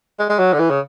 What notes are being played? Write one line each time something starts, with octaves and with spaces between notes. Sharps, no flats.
G#3
G#3
F#3
D3
E3
C#3